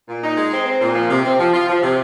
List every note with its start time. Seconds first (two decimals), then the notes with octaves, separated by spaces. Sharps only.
0.09 A#2
0.23 D#4
0.37 G#3
0.53 C4
0.66 C4
0.81 A#2
0.95 F3
1.10 C3
1.25 C4
1.39 F3
1.54 F4
1.69 F3
1.83 C3